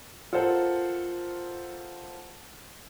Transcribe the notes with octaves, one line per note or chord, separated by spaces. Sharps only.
F4 A4 A#4 C5 F#5